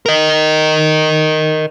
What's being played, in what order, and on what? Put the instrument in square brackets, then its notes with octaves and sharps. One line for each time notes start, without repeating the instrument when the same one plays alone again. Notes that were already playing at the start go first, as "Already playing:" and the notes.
[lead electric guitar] A#4 D#5